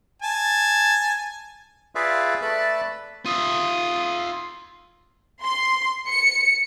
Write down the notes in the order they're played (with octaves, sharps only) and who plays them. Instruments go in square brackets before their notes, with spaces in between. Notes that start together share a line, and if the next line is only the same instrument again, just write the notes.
[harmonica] G#5 A5
[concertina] F4 G#4 B4 D5 E5 F5
A3 A4 B4 D5 A5 B5
[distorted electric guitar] F4 E5 [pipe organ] D#6
[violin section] C6
C#7